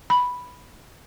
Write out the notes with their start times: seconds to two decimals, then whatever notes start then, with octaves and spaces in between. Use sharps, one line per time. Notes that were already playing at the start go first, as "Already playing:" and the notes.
0.10 B5